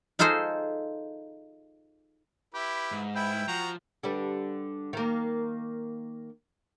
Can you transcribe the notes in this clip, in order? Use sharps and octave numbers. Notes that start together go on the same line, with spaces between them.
D#4 F4 G#4 A4 C5 D#5
E4 G4 B4
G#2
E4 B4 G5
F3 F#4 A#5
D3 G3 B4
D#3 A#3